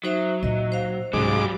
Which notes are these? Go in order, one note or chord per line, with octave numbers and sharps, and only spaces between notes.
F#3 D#4 C5 E5
A#2 D#4 D#5
C5 F5
C2 G#2 F#3 G3 C#4 D6